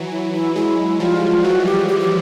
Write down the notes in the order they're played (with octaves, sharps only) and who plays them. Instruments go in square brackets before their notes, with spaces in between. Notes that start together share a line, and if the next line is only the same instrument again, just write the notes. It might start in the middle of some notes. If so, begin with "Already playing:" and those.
Already playing: [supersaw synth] E3 F#3
[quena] E4
E4
[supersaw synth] F#3 G#3 [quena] E4
[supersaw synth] F3 G3 [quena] F4
[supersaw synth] E3 F#3 [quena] F#4
[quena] G4
G4
G4